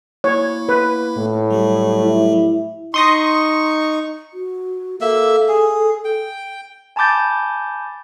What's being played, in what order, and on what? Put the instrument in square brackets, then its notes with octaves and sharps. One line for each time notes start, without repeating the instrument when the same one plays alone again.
[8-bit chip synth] A#3 E4 [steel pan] C#5
[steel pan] B4
[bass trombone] A2
[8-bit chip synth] F#3 G3 G4
[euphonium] E4
[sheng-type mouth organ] D#4 C#6 [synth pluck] C6 D#6 A#6
[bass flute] F#4
[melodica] A#3 E5 [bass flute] A4
[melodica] G#4
G5
[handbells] G#5 A5 B5 D6 G6 A6